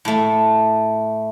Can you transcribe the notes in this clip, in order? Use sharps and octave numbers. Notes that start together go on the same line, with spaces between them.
A2 A3